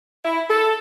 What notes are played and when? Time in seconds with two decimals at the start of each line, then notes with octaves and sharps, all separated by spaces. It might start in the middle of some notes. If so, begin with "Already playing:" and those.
0.25 E4
0.50 A4